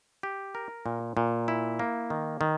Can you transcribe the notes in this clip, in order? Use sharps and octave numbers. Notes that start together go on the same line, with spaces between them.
G4
A#4
A#2
A#2
E4
A#3
D#3
D#3